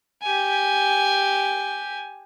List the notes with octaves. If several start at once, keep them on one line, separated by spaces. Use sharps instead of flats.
G4 G#5